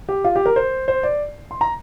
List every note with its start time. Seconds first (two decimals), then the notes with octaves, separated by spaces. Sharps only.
0.09 G4
0.24 F4
0.36 G4
0.46 A#4
0.56 C5
0.88 C5
1.03 D5
1.51 C6
1.61 A#5